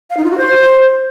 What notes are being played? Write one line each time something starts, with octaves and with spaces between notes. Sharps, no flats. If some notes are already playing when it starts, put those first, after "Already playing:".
F5
D#4
F4
F#4
C5